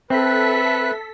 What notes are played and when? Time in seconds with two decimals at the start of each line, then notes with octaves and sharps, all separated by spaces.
0.10 C4 A4 B4 E5 F#6 B6